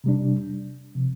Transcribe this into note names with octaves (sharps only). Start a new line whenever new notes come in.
C3 G3 D4
C3 F3